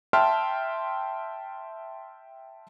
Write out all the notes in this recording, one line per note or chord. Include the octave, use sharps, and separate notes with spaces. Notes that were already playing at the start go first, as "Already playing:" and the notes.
E5 G5 A5 C6 F6